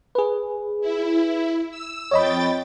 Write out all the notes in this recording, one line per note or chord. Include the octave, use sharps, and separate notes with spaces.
G#4 B4
E4
E6
F2 C#5 D#5 G5 B5 A6